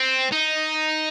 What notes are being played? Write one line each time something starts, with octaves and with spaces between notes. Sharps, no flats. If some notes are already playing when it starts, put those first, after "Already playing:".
Already playing: C4
D#4